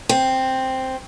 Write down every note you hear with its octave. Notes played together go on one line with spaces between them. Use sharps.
C4